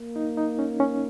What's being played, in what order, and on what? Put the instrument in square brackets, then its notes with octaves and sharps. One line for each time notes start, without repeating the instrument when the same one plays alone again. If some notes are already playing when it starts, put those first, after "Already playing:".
Already playing: [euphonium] A#3
[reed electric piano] D#4
D#4
C#4
C#4